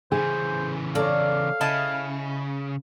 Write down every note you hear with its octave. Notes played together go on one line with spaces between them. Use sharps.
C#3 E3 G#4 C5
A4 C#5 D5 F5 A#5
C#3 E4 D#5 A5